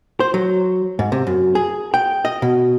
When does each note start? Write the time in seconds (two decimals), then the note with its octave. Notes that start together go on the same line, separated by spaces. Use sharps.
0.20 C5
0.34 F#3
0.99 G#2
1.12 C3
1.27 F#2
1.55 G#4
1.94 G5
2.25 D#5
2.42 B2